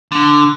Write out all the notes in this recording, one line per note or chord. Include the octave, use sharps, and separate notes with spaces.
D3